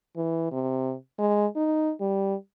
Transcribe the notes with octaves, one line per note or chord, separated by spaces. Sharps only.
E3
C3
G#3
D#4
G3